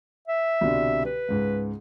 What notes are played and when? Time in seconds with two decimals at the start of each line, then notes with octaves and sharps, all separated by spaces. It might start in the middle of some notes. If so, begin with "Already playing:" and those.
0.28 E5
0.61 C2 B2 D3
1.05 B4
1.28 C#2 G#2